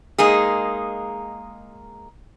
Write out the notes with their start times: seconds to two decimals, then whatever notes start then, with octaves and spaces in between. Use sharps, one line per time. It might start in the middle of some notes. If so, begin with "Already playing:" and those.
0.18 G#3 A#3 D#4 G#4